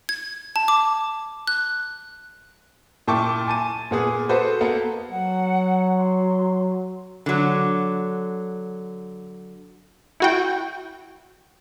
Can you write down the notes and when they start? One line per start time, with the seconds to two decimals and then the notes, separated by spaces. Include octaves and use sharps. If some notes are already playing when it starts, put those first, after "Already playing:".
0.09 G#6
0.56 A5
0.68 D6
1.47 F#6
3.07 A#2 E4 G5 A5 C#6 D6
3.47 G#5 A5 D#7
3.91 A#2 B3 G#4
4.29 F#4 A4 B4 C5
4.61 A#3 B3 A4
5.11 F#3 F#5
5.98 C6
7.26 D3 F#3
10.20 E4 F#4 G5